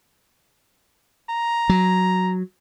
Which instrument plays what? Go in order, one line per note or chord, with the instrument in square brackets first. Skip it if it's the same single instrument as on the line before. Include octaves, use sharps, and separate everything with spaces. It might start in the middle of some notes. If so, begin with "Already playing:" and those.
[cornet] A#5
[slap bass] F#3